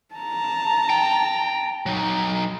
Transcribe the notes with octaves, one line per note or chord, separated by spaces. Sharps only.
A5 A#5
G5
F#3 D#4